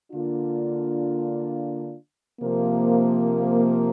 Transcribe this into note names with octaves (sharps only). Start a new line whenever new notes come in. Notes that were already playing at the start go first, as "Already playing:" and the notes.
D3 A#3 D4 F4
C3 F3 A#3